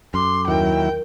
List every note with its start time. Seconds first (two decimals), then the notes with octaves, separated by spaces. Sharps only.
0.14 F#2 A4 C6 D6
0.48 D#2 F#3 E4 A#4 G5